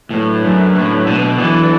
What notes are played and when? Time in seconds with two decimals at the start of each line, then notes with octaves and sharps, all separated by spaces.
0.11 A2 D3 F#3 A3 D4 B4
0.43 F#2
0.75 A2
1.07 B2
1.38 E3 F#3 B3 D4 A4 D5